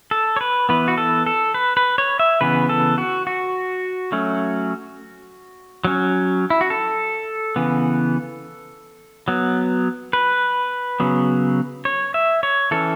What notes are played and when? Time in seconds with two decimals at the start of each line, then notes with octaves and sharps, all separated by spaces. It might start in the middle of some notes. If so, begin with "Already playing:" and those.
0.11 A4
0.36 C#5
0.41 B4
0.69 E3 B3 B4
0.88 F#4
0.98 A4
1.26 A4
1.54 B4
1.77 B4
1.98 C#5
2.19 E5
2.41 C#3 E3 B3 B4
2.69 A4
2.98 F#4
3.27 F#4
4.12 F#3 A3 C#4
5.85 F#3 C#4
6.50 E4
6.61 F#4
6.70 A4
7.56 C#3 E3 B3
9.28 F#3 B3
10.13 B4
11.00 C#3 F#3 B3
11.85 C#5
12.14 E5
12.43 C#5
12.71 E3 C#4 A4